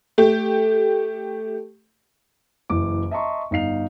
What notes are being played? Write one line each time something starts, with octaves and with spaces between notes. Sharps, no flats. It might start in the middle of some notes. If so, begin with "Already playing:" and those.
A3 G4
F#1 E3 D6
D#5 E5 A5 A#5 C6 C#6
G1 D#4 F5 C7 F7